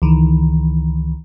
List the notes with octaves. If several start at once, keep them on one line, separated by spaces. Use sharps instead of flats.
C#2 D#3 E3